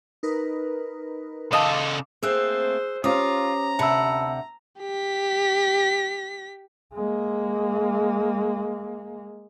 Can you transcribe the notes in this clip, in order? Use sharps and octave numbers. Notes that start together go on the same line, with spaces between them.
D#4 A#4 B4
C#3 A4 D#5 F5 C6 D6
A3 A#3 C4 G#4 C5 E6 F#6
C#4 F4 G4 C5 F5 A#5 D6 D#6
D2 C3 F#5 A5 B5 E6
G4 B6
G#3 A#3